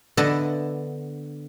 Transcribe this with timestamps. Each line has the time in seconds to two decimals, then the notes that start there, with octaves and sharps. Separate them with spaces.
0.17 D3 B3 A4 D#5 E5